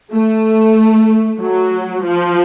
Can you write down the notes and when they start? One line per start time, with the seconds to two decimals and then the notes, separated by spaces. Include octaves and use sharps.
0.12 A3
1.40 F#3
2.04 F3